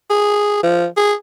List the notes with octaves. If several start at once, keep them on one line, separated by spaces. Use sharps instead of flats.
G#4
F3
G#4